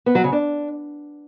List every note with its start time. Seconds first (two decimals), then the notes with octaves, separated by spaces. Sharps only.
0.06 B3
0.15 F#3
0.24 C#3
0.33 D4